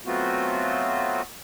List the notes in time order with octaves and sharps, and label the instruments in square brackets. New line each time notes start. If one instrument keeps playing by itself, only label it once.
[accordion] F#3 A3 B3 C4 F4 F#4